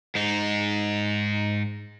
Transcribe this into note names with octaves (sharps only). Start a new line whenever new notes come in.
G#2 D#4